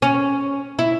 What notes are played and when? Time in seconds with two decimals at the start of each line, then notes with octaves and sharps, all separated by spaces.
0.02 C#4
0.79 E4